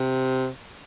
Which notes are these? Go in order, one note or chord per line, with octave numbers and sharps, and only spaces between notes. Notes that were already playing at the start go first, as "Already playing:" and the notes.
Already playing: C3